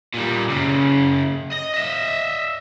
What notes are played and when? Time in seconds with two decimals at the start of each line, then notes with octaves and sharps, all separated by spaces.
0.14 A#2 G3
0.50 F#2 C#3
1.52 D#5
1.74 D#5 E5